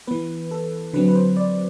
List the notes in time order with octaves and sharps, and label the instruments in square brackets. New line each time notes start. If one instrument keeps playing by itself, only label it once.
[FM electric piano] E3 B3 B4
A4
D3 F#3 C4 B4
B4
C5
D5